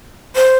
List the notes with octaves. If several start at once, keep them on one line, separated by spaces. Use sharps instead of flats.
C5